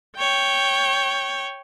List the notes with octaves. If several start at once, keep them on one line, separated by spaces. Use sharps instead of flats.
C#5 G5